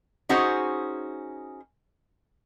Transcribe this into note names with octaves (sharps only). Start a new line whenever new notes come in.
C#4 D#4 F#4 G#4 C5